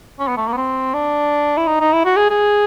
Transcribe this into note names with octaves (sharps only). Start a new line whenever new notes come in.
C#4
B3
A3
A#3
B3
C4
D4
E4
D#4
D#4
E4
F#4
G#4
G#4